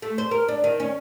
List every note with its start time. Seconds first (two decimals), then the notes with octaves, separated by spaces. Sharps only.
0.02 A3
0.18 C5
0.31 A#4
0.48 D4
0.64 D#3
0.80 C#4